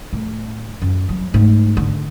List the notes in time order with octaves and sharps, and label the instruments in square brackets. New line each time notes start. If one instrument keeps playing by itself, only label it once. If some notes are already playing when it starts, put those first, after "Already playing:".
[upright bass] A2
F#2
F#3
G#2 A3
D3